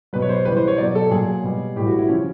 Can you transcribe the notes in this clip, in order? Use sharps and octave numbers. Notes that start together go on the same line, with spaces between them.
B2 F#3 B4
C#5
C5
C#3 E3 G3 B4
C5
C#5
B2 F#3 D5
A4
A#2 F#3 G#4
B2 G3
A2 E3 G3 G4
F#4
E4
C#3 F3 C#4